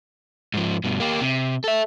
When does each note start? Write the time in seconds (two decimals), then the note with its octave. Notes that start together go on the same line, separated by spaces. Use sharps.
0.54 G#2 F3
0.84 G2 B2
1.00 A#3 G4
1.21 C3
1.64 A4 E5